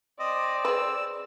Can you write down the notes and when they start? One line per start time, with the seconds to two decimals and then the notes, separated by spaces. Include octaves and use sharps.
0.20 C4 D5 D#5
0.65 G#4 B4 E6